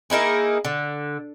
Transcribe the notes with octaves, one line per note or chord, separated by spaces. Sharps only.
A#3 D#4 E4 G#4
D3